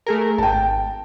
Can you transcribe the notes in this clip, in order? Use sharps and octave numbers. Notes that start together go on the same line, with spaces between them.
A3 G#4 A#4
G#1 G5 A5